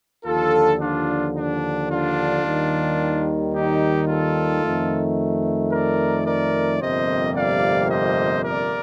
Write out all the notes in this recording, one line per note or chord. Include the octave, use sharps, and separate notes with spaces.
D#2 D3 F3 F4 A4
D4 F4
D4
D4 F4
D#2 D#3 G3
D#4 G4
F4 A4
F2 D#3 A3
A#4 D5
A#4 D5
G1 F2 C3 G3 A#3 C5 D#5
D5 F5
C5 D#5
A#4 D5